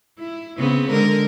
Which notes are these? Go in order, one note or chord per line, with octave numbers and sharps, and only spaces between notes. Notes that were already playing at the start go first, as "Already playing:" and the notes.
E4
C#3 B3 C4
D3 G#3 A#4